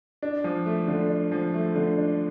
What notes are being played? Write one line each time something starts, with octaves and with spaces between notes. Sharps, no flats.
D4
F3
A3
D3
D4
F3
A3
D3
D4